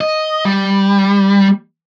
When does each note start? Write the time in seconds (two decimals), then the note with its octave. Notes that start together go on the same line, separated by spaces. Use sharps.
0.01 D#5
0.45 G3